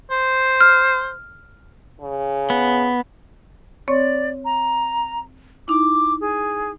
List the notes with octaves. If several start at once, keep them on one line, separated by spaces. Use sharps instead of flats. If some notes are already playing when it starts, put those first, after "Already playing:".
C5
F6
C#3
B3
C4 C#5 D5 C#6
A#5
D#4 E4 D6
G#4